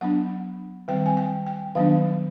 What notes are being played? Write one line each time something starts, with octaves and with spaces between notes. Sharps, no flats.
F#3 B3 D4 F#5
D#3 G3 C4 G5
G#5
G5
G5
D#3 F#3 B3 D4 F5